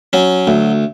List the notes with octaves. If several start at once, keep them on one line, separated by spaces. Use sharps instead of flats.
F#3 C#4
D2